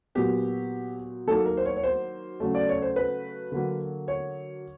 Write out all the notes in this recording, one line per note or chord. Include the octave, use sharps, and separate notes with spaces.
A#2 F#3 B3 G4
D#3 F#3 A#3 A4
A#4
C5
C#5
C#5
C5
C#3 F#3 A3
D5
C#5
C5
B4
D3 F#3 A#3
C#5